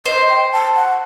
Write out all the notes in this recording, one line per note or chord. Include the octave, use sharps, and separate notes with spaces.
C5 D#5
G5
A5
F#5